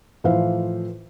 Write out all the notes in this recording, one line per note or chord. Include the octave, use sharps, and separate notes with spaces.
A2 E3 F3 C5 E5 F5